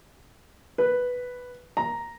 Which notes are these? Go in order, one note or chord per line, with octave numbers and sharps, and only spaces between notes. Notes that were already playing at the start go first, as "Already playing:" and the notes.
B4
A#5